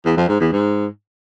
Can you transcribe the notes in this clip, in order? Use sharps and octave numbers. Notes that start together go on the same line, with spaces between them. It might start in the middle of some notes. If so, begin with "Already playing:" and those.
E2
F2
G#2
E2
G#2